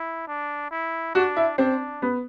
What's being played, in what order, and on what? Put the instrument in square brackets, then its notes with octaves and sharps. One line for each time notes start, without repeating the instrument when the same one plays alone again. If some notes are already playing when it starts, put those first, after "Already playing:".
Already playing: [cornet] E4
D4
E4
[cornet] D4 [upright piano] F#4
[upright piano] E4
[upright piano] C4 [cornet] D4
[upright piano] B3